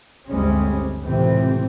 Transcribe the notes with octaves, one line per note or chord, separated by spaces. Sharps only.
G1 D2 G3 G#3 C4 C#4
C#2 A2 C3 E3 C4